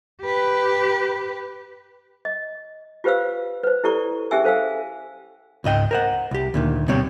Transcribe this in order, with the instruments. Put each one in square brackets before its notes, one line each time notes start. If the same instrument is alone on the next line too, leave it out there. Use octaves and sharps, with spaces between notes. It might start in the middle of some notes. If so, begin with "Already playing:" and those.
[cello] G4 B4
[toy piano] D#5
F4 G4 B4 C5 F5 E6
B4 C5
E4 G4 A4 D5 A#5 C#6
C#4 G4 G#4 E5 G#5 E6
A4 C5 F5 G#5 E6
[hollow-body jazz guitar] C#2 G#2 D#5 G5
A#4 C5 F#5
C2 G4
D2 A#2 D#3
B2 G3 C4 G4 C#5